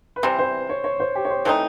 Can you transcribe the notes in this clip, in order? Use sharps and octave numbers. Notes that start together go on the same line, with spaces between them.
B4
C3 E3 G3 C5
C5
C#5
C#5
C5
G4
C#5
C5
E3 A3 C4 D#4 C5